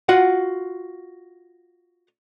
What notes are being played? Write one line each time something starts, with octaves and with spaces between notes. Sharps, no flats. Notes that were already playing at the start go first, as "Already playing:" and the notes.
F4 F#4 F#5